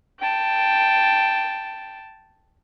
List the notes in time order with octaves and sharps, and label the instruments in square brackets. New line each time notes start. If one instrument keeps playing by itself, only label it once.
[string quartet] G5 A5